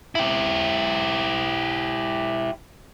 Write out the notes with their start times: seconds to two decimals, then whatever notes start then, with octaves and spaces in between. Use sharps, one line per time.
0.15 E4 G4